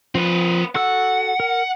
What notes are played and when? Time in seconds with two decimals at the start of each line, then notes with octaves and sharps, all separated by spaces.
0.15 F3 C4 B4
0.75 F#4 A4 F#5 E6
1.40 A#4